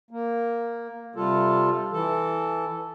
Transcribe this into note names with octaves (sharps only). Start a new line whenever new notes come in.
A#3
C3 G3 F4 A4
E3 A4